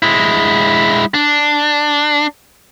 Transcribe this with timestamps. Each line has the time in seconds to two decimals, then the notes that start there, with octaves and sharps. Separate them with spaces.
0.02 G#3 E4
1.14 D4